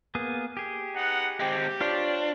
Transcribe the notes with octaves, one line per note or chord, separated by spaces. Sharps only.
A#3 B3 G#4
G4 G#4
B3 D#4 F#5
G#3 C4 G4
D4 F4 C5 C#5